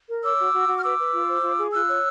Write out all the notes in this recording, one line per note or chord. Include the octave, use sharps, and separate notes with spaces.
A#4
C#5 D6 E6
F#4
F#4
F#4
F6
B4 D6 E6
B4
F4
C5
F4
G#4
F4 E6 F#6
C#5